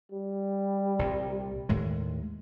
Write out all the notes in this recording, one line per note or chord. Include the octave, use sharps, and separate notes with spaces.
G3
C2 A#2
D#2 A2 G#3